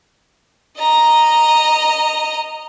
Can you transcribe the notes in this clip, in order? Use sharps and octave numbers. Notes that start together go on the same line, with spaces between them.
D#5 A#5